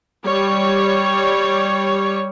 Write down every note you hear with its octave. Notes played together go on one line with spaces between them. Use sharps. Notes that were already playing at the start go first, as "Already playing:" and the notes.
G3 C#5